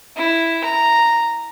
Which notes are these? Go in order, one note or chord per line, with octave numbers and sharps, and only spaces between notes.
E4
A#5